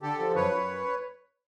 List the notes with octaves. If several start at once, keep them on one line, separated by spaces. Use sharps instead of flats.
D3 G4 A4
F3
F#2 B4 C#5
F#2